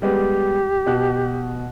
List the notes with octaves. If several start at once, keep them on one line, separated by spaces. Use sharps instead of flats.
G3 G#3 B3 G4
B2 F#4 F#6